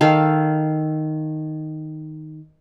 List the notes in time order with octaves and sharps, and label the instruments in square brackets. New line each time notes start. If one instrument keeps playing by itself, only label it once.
[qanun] D#3 A4 F5